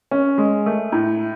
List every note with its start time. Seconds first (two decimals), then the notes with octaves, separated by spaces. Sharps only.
0.11 C#4
0.38 G#3
0.66 A3
0.92 A2